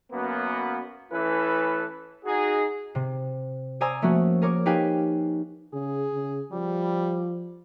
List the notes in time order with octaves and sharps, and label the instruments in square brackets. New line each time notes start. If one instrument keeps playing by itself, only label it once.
[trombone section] F#2 A#3 B3
E3 A3 C#4 E4 A4 B4
D#4 F#4 G#4
[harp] C3
C5 D5 G#5 A#5 D#6 E6
F3 A3 A#3 C#4 F#4
G#4 A#4 C#5 D6
D#4 G4 B4 F5 G5 G#5
[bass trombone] C#3 [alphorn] G#4
[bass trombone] C#3
[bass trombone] F3 [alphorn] G3